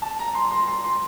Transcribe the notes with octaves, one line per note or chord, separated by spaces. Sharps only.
A5
A#5
C6
C6
C6
C6